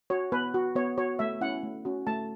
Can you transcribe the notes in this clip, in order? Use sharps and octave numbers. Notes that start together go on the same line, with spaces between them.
F#4 C#5
B3 B4
F#4
B3 C#5
F#4 C#5
A3 E5
C#4 E4 F#5
A3
C#4 F#4
A3 A5